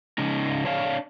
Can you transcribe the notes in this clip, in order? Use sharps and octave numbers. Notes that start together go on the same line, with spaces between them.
C#3 G#3 C#4 D#4
D4 C#5 F5